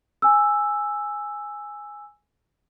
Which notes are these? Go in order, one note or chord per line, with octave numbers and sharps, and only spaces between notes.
G#5 E6